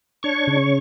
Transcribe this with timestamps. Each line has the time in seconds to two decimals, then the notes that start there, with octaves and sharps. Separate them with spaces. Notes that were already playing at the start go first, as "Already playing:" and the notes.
0.23 D4 C#5 C#6
0.47 C#3